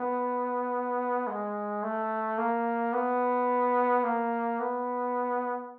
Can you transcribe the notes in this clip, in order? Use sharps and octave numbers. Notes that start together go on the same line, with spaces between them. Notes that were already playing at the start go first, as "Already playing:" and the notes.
Already playing: B3
G#3
A3
A#3
B3
A#3
B3